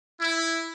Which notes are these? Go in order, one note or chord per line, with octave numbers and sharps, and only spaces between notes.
E4